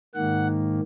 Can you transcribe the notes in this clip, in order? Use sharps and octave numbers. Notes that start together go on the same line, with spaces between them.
G#2 D#3 A#3 F#5